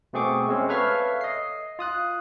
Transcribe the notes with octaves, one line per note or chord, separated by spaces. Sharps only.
B2 A3 C4 G#4 C#6 D6
G#3 C4 C#4
A4 B4 C#5 E5 F5 F6
D#5 C7
F4 D#6 F#6